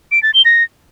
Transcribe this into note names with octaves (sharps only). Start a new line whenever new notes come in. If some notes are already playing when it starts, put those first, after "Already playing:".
D7
A6
G7
A#6